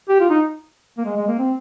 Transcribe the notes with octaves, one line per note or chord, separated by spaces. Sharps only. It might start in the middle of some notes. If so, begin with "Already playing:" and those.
G4
F4
D#4
A#3
G#3
G#3
A#3
C4